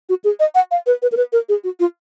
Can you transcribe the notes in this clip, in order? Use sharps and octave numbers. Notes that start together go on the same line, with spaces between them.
F#4
G#4
D#5
F#5
F5
B4
B4
A#4
B4
A#4
G#4
F#4
F4